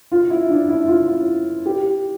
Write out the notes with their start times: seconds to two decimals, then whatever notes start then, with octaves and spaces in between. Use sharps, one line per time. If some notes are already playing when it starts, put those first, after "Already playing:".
0.12 F4
0.30 E4
0.50 D4
0.69 E4
0.88 F4
1.66 G4